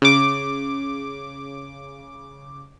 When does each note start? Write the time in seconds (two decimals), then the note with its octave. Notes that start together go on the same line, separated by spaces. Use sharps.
0.02 C#3 D6